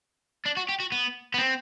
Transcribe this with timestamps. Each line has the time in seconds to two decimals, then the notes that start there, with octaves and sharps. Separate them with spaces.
0.46 D4
0.57 F#4
0.69 G4
0.80 F#4
0.92 B3
1.34 B3
1.39 C4